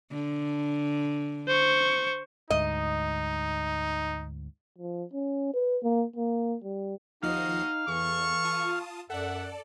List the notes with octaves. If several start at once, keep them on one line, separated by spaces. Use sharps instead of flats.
D3
C5 C#6
D2 G#2 D#4 D#5
F3
C#4
B4
A#3
A#3
G3
D#2 F3 D#4 F#4 D#5 F5 C7
E2 E3 A4 C#6
F4 A5 D#6
F#2 A4 D5 E5 F#5